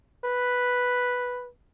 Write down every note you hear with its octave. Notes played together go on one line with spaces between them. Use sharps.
B4